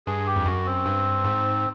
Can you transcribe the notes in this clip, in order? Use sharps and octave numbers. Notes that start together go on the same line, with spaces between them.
G2 G#4
G4
F2
F#2 F#4
C4
G2
G#2